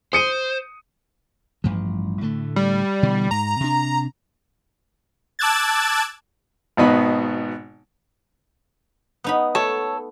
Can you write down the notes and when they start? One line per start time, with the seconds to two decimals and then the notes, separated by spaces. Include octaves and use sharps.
0.13 C5 D#6 C#7 D#7
1.64 A1 G2 F3
2.21 A2 D3 A3
2.56 G3
3.03 B2 D3 E3
3.31 G#2 A#5
3.60 C3 D4
5.39 A5 D6 E6 F#6 G#6 A6
6.77 G#1 B2 B3 D#4 B5
9.24 B3 D#4 B5
9.55 A3 A4 C#5